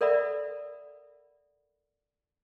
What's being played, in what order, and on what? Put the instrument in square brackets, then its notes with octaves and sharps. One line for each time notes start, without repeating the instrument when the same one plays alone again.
[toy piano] A4 A#4 D5 E5 F#5 B5